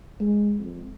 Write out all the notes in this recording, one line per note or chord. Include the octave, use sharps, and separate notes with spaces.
G#3
F2